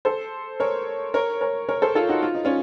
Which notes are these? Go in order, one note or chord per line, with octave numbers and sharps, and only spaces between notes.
A4 C5
A#4 C#5
A#4 C#5
A#4 C#5
A#4 C#5
A4 C5
F4 A4
D#4 F#4
F4
D#4
C#4 F4